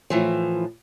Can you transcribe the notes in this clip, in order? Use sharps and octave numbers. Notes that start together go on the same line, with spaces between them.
A2 E3 F3